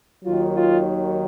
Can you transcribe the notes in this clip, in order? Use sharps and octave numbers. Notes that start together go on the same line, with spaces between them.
D#2 D#3 F#3 F4
F4